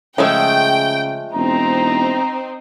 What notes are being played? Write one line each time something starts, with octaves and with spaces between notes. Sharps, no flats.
C#3 F3 G#3 A3 G5
E1 C4 D#4 A#5